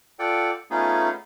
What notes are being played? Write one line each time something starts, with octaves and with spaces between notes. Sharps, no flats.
F4 A4 D5 F#5 G5
A3 B3 C#4 D#4 F4 G#4